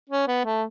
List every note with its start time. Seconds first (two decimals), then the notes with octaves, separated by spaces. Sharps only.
0.09 C#4
0.28 B3
0.45 A3